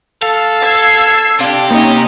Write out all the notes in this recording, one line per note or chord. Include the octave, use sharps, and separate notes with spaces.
A4 F5
E6 G#6 C7
C3 D4 G4 F5
A#3 C#4 D#4